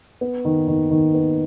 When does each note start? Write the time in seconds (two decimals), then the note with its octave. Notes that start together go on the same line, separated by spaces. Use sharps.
0.21 B3
0.45 D#3
0.68 D#3
0.91 D#3
1.14 B3